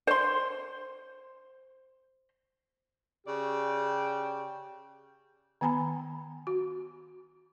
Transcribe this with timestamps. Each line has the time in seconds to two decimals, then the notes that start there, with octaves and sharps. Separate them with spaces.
0.07 C5 C6
3.27 C#3 G4 D5 G5
5.61 D#3 B3 G#5 A#5 B5
6.47 F#4